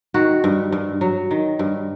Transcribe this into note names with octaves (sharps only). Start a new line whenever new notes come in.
D#3 F#4
G2
G2
F#3
D#3
G2